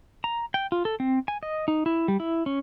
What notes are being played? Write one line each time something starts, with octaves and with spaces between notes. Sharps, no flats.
A#5
G5
F4
A4
C4
G#5
D#5
D#4
E4
G3
E4
C#4